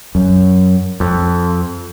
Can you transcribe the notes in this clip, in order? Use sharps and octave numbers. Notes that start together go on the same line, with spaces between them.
F#2
F2